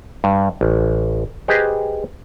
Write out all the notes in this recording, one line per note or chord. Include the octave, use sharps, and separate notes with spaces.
G2
A1
G4 G#4 B4 C5 D#5